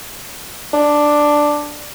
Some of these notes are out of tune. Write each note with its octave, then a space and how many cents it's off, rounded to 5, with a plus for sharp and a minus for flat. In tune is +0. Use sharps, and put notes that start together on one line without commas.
D4 +5